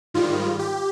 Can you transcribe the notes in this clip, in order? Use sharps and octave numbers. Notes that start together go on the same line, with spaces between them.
G#2 D#3 G3 F4
G4